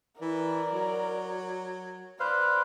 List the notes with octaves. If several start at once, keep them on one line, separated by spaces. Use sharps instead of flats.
E3 A#4 D5
F#3
B4 C5 D5 F5